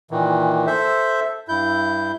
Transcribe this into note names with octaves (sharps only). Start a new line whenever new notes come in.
A#2 D#3 E3
A4 C5 E5
G2 E4 G6